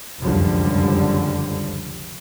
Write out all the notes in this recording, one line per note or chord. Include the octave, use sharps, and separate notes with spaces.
F1 C#2 F#2 D3 F3 G3